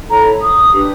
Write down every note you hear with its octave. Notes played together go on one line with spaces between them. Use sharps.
E4 A4 C#5 A#5
D#6
D4 G4 B4